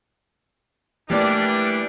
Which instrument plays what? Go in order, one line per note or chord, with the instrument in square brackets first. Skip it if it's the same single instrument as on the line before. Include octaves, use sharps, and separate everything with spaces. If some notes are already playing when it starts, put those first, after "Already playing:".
[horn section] E3 G3 D4 [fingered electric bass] F3 A3 A#3 [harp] G4 D5